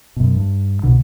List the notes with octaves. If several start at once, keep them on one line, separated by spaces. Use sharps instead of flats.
F#2 B2
G2
C2 B2 D3